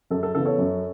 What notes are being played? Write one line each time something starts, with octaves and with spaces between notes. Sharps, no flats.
F#2 A4
A4
C#3 E3 B3 A4
A4 C#5
F#2